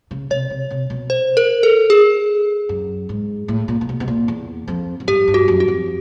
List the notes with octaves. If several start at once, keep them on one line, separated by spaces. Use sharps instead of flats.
C#3
C3 C#5
C3
C3
B2
C5
A#4
A4
G#4
F#2
G#2
A2
A#2
A#2
B2
B2
A#2
E2
F2
F#2
G2 G4
G2
F#4
F#2
F#4
F2